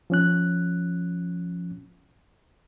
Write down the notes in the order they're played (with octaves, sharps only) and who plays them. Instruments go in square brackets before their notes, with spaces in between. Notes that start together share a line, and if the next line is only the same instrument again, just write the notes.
[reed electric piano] F3 C#4 F#6